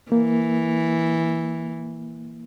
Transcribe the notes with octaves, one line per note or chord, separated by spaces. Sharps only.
E3 A#3